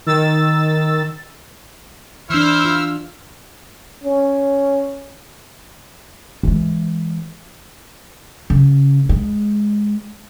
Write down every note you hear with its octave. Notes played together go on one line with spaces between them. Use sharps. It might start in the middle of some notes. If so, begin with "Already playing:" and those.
D#3 E6 A6
E3 D4 E4 C5 E6 F6
F4
C#4
E3 G#3
C#3
G#3